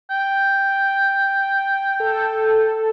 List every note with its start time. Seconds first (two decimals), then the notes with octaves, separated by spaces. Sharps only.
0.10 G5
2.00 A4